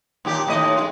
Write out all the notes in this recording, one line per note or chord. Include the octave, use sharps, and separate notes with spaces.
D#2 A#2 G4
D#2 A2 D#5
G#3 F4